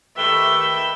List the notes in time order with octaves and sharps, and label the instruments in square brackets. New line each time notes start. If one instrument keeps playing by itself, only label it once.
[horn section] D#3 A3 G4 [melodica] B4 G5 [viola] E5 [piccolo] G7